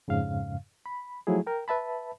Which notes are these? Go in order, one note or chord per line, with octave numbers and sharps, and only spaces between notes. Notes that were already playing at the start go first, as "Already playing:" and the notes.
F2 G#2 C#3 F5
B5
F3 F#3 A3 E4 G#4
A#4 G5
B4 E5 A5 B5